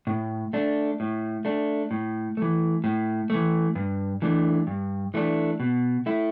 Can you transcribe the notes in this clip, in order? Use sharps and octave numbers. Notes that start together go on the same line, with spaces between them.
A2
A3 D4
A2
A3 D4
A2
E3 A3
A2
E3 A3
G2
E3 A3 D4
G2
E3 A3 D4
B2
A3 E4